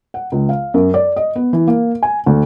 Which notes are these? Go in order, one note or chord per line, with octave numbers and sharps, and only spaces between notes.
F#5
C#2
F5
F#2
D5
D#5
B3
E3
A#3
G#5
D2